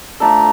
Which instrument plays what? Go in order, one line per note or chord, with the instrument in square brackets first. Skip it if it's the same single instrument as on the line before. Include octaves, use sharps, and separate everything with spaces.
[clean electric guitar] F3 A3 D4 A4 [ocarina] A#5